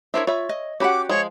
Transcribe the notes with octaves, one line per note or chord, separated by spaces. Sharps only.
D4 E4 A#4 C5 C#5 E5
F4 C#5 E5 B5
D#5
C#4 F#4 G4 F#5 B5 D6
F3 G#3 C#5